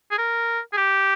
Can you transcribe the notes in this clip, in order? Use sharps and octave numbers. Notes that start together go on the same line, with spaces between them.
G#4
A#4
G#4
G4